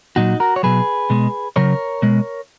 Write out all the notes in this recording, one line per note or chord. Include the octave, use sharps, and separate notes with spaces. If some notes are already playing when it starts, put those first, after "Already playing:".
A#2 F#3 D#4 F#4
F#4 A#4
C#5
B2 F#3 G#4 B4
B2 G#3
C#3 F#3 A#4 C#5
B2 G#3